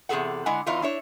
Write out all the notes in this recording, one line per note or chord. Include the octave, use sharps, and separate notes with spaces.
E2 C3 F3 G#4 A4 F#5
D3 G#3 E4 F#5 G#5
E2 E3 D#4 F4
D4 E4 C#5